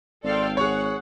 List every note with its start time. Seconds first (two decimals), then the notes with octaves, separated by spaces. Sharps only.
0.24 G#1 A4 D5 F5 G5 C6
0.57 G#4 C#5 F#5 C#6